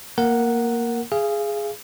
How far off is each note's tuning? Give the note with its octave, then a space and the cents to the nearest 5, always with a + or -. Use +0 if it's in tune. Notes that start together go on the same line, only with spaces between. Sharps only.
A#3 +0 A#4 +0 F#5 +0
G#4 +0 F5 -30